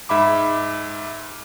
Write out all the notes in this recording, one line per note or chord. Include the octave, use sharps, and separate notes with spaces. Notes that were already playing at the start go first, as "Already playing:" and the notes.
G#2 E5 B5 D6